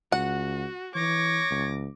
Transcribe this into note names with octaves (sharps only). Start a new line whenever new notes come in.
C#2 F#4 F#5
E3 C#5 D6 A#6
C#2